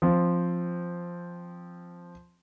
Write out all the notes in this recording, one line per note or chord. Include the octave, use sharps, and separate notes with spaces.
F3 C4